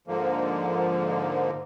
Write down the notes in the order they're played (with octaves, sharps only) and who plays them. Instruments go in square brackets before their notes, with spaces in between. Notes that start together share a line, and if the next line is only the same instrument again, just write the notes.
[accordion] G#2 D3 F3 A#3